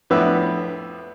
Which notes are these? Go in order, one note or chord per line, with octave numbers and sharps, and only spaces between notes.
F2 A2 B3 D4 B4 E5